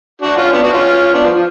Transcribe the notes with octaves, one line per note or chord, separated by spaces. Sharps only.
D4 F#4
C#4 F4
B3 D4
D4 F#4
C#4 F4
B3 D4
F3
F3